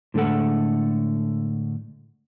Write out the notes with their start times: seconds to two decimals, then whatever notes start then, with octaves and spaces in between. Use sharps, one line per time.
0.14 A2 D3 G#3 A3 A4 F#5